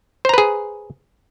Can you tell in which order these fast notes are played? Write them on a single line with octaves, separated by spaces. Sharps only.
C5 A#5 B4 G#4